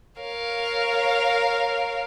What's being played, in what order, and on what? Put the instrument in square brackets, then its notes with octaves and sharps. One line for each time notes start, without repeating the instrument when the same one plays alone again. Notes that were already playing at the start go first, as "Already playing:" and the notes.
[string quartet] A#4 C#5 F5